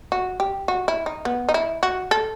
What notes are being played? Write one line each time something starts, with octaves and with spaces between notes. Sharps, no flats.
F#4
G4
F#4
E4
D#4
B3
D#4
E4
F#4
A4